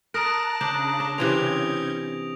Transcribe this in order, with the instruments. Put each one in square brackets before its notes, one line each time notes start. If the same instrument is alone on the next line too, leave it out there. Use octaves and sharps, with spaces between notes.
[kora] A#4 [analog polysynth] A5 A#5 F#6 [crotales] D#6 A#6 D7
[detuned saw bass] C#3 [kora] D4 [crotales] G6
[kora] D4
[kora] C3 E3 C4 [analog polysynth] C#4 G6 G#6 [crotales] F7